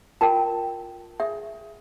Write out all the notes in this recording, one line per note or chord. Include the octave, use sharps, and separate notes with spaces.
F4 A#4 G5 A5
G#4 E5